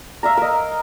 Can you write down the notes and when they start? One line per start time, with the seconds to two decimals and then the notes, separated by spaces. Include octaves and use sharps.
0.23 E5 F5 A#5
0.37 A#4 D#5